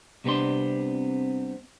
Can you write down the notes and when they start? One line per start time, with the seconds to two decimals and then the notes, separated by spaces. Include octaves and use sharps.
0.24 C2 C3 B3 C4 D4 C6